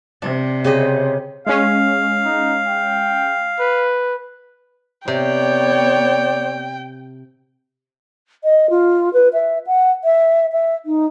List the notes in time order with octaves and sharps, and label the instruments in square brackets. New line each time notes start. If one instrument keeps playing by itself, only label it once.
[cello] C3 [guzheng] D4
[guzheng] C#3 G4 D#5
[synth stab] G#3 C#4 [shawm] F5
[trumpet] D#4
G5
B4
[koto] C3 [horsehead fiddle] B3 C#5 [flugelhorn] D5 [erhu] G5
[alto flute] D#5
F4
B4
E5
F#5
E5
E5
D#4